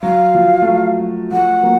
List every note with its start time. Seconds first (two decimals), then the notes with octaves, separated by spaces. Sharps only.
0.02 F#3 F5
0.35 F3
0.62 A3
0.67 F#3
0.98 F#3
1.31 F3 A3 F#5
1.63 F#3 A#3